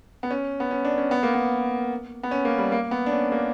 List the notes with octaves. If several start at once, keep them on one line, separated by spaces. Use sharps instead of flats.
B3
C#4
B3
C#4
D4
C#4
B3
A#3
B3
B3
C#4
A#3
G3
A#3
B3
D4
C#4
A#3